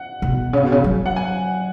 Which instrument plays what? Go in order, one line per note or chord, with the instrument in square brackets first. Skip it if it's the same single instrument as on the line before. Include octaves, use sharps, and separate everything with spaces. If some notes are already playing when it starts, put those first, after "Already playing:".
Already playing: [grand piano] F#5
[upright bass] B2
C#3
B2
C#3
F#3
[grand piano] F#5
G#5